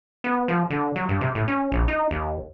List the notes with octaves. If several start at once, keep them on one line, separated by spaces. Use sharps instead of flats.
B3
F3
D3
F#3
G2
C3
A2
C#4
A#1
D#4
D#2